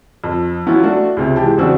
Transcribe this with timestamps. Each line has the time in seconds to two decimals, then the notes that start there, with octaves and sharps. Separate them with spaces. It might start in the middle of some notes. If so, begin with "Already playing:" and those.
0.24 F2
0.66 E3 F#3 B3 C#4 E4 F4
0.83 A3 D4 F#4
1.17 C#2 C3
1.36 E3 G#3 G4 A5
1.58 E2 C#3 C4 D4 F#4 E6